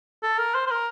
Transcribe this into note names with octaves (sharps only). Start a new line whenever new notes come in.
A4
A#4
C5
C5
A#4